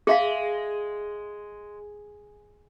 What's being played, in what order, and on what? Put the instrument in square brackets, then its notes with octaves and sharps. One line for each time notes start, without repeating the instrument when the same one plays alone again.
[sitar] G#3 [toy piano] G#4 E5 F5